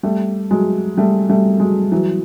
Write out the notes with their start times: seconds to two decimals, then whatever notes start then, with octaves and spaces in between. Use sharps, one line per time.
0.03 G3 A3
0.51 F#3 G#3
0.98 G3 A3
1.30 G3 A3
1.60 F#3 G#3
1.92 E3 F#3